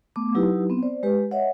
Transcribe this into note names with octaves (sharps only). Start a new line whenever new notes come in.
A3 B3 D6
F#3 D#4 E4 G4 B4
B3 C4
C5 D5
G#3 G4 B4
C#5 D#5 E5 F#5